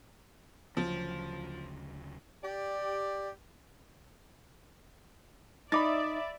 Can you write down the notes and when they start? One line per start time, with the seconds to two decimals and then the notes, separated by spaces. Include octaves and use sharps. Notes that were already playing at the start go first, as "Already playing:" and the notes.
0.77 D2 C#3 F3 F#3
2.44 G4 D5
5.72 D#4 D5 E5 B5 D6 A6